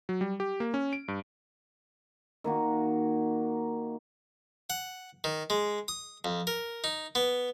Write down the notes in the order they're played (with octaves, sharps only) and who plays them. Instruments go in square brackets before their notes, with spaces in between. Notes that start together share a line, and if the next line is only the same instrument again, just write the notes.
[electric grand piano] F#3
G3
G4
A#3
C#4
D7
G2
[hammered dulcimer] D#3 A#3 F#4
[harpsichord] F#5
D#3
G#3
D#6
F2
A#4
D#4
B3